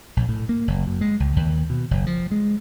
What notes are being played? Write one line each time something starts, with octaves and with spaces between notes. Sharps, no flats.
A#1
A2
A#3
F#1
F#2
G#3
C#2
D#2
B2
F#1
F3
G#3